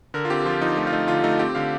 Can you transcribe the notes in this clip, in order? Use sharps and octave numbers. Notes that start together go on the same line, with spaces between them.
D3 A#4
F4
C4 G4
F3 F4
F3 D#4
A3 F4
F4
A3 D#4
D3 F4
A3 D#4
C4 G4
D3 F5